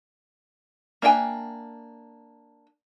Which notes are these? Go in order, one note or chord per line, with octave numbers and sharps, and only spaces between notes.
A#3 D4 E5 G5 G#5